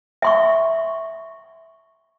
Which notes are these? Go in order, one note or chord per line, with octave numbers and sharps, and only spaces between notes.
E5 C6 C#6